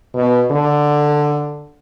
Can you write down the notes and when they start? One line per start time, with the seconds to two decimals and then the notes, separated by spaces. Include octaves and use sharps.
0.15 B2
0.51 D3